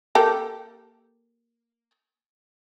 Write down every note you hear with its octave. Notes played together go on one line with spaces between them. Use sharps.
A#3 G4 A4